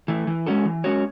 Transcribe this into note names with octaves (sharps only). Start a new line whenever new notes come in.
E3 A3
E3
G#3 C#4 F#4 A4
E3
G#3 C#4 F#4 C#5